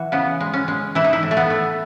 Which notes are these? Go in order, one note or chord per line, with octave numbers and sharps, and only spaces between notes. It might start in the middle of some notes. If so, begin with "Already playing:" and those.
Already playing: E3 F#4
C#3 B3
G#3
C#4
G#3
E3 E4
D#4
E4
A2
A3
B3
A3